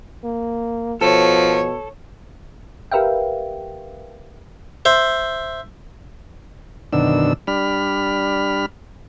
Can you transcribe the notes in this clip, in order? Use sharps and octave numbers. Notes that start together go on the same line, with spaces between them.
A#3
B2 F3 A4 C#5
G4 A#4 B4 E5 F5 G5
C5 E5
F#2 B2 D3 D#3 D4 E6
G3 D4 B5 F6